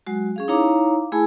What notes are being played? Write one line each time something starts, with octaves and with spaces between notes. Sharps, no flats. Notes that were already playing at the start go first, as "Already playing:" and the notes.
F#3 G#3 F#4
C#4 G#4 F5
D#4 E4 C#5 F5 A#5 D6
A3 E4 G#4 G#5 B5